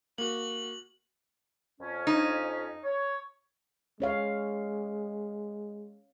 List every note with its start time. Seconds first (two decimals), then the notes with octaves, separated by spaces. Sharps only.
0.18 A#3 F#4 F#7
1.80 F2 C#4
2.07 D#4
2.84 C#5
4.00 G#3 C#4 C#5 F5